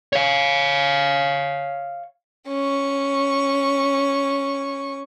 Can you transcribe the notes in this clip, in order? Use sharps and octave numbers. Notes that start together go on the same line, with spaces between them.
C#5 F5
C#4 C#6